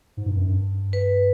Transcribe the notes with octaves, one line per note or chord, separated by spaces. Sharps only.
G#2
G2
F#2
G2
B4